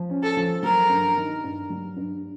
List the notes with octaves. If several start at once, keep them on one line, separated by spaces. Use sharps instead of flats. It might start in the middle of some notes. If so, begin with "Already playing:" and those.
Already playing: F3
C#4
A4
F3
F#3 A#4
G2
D#3
G2
F#3
G2